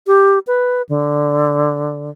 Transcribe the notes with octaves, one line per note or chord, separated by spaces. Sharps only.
G4
B4
D3